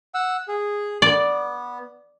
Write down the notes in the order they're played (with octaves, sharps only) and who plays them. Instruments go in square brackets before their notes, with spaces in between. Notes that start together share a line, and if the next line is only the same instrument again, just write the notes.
[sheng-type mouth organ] F#5 E6
G#4
[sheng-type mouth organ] B3 [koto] D5